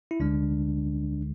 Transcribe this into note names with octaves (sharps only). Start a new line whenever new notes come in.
E4
D2 D3 G#3 D4